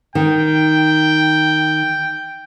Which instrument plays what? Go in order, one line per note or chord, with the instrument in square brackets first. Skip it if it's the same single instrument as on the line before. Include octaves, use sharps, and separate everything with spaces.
[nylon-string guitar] D#3 [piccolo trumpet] G5